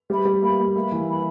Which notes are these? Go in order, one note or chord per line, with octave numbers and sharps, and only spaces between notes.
G3 B4 E5 B5
G3
A#3 B4 E5 B5
A#3
A#3 B4 E5 B5
E3
B4 E5 B5